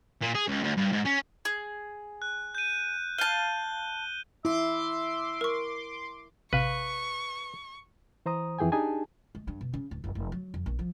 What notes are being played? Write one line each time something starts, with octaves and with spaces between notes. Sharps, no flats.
A#2
G#4
C#2
D2
G2
G#2
C#4
G#4
F#6
G6 D#7
F5 A5 G6 D#7 G7
E4 E5 C6 D6
A#4 C#6
A1 C3 B4 F5 C#6
E3 C5 A#5 D#6
F2 E3 G#4 G5 G#5
D4 D#4 G4 G#4 G#5 A5
G#3
G2
B2
C#3
D1
F#1
F1
F#3
F2
A#1
F3